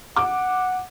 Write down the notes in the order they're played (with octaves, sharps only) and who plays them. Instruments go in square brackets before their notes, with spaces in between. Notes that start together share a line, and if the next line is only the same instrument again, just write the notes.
[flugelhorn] F#5 [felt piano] D6